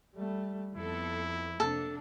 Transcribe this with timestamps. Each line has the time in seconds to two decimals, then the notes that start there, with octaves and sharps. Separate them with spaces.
0.15 G3 A3
0.75 F2 B3 E4 A4
1.60 C3 A#3 D4 A4